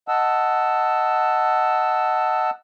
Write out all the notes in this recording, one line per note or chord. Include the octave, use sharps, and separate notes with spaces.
D#5 F#5 A5 E6